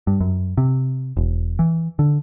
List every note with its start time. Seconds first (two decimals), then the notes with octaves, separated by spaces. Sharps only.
0.07 G2
0.21 F#2
0.57 C3
1.17 E1
1.59 E3
1.99 D3